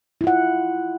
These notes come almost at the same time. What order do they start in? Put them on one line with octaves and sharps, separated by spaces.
E4 F4 F#5